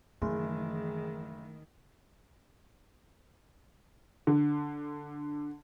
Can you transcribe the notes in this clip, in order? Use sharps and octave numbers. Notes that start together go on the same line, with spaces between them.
F#1 D#3 E3 A3 G#4
D3